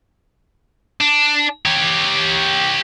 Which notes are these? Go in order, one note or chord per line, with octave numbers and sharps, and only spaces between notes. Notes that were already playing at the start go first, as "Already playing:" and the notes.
D4
G4 C#5